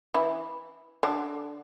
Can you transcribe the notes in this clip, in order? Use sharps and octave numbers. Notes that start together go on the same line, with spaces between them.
E3 E4
D3 D4